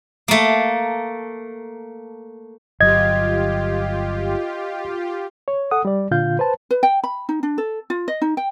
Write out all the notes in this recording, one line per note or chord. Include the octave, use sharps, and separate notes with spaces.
A3 A#3
G1 F#3 F4 G4 D#5 G#6
C#5
A4 F#5 D#6
G3 D5
A#2 D3 F4 F5 G6
B4 C5 A5
B4
G5
B5
D#4
D4
A4
F4
D#5
D#4
G5